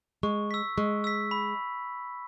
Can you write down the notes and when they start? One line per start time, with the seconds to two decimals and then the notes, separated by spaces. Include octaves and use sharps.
0.23 G#3 C#6
0.51 E6 B6
0.77 G#3 C#6
1.04 E6 B6
1.31 B5